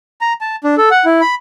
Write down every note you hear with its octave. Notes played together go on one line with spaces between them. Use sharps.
A#5
A5
D4
A4
F#5
E4
B5